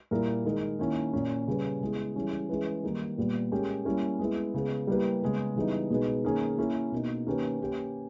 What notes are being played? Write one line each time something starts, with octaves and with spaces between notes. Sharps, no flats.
A#2 G3 A#3 E4 A#4
D#3 G#3 D#4 A#4
D#3 A#3 C#4 E4
A#2 A#3 C#4
C#3 G3 C#4 G4 B4
C#3 G#3 B3 E4
E3 G3 C#4 E4 G#4
E3 G#3 C#4 G#4 B4
D#3 G3 A#3 D#4
A#2 G3 B3
G#3 C#4 G4 A#4
G3 A#3 C#4 E4 A#4
G#3 B3 E4
C#3 G#3 B3
G3 A#3 E4 G4 B4
C#3 G#3 B3
C#3 E3 G3 B3 D#4
B2 G#3 D#4 G#4 B4
D#3 A#3 C#4 G#4
A#3 C#4 E4 A#4
B2 A#3 D#4
D#3 A#3 C#4 G4 B4
A#3 C#4 G4 B4